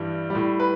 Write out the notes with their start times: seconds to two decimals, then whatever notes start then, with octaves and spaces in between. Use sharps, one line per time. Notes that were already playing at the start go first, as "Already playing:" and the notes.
Already playing: G2 E3 G3
0.30 G3
0.35 A2
0.60 B4